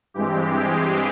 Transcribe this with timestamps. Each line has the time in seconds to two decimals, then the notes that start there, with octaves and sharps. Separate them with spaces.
0.14 G2 E3 G#3 C4 G4
0.53 G#4